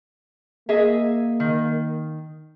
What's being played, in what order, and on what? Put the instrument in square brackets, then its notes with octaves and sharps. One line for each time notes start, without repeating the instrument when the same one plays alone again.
[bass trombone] A#3 [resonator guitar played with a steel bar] G#4 D#5 E5
[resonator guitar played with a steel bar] D#3